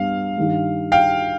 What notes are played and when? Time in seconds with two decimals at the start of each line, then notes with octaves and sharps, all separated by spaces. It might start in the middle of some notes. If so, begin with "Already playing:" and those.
Already playing: G2 B3 F5
0.38 G2 D#3 G3
0.92 F5 G5